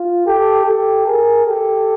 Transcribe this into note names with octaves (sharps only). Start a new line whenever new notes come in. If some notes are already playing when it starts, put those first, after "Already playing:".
Already playing: F4
G4 A4
G4 A4
G#4 A#4
G4 A4